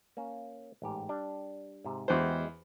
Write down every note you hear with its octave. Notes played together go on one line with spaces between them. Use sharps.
A#3 C#4
A1 G#2 G4
G3 D4
G#2 C3
E2 G#3 F#4 G4 C5